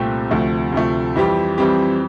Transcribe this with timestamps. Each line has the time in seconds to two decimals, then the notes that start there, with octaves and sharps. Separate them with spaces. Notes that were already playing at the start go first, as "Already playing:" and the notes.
Already playing: C2 A#2 A3 C4 G4
0.30 D2 C3 F3 A3
0.72 D2 C3 F3 A3
1.15 F2 E3 G3 C4 G4
1.58 F2 E3 G3 C4 G4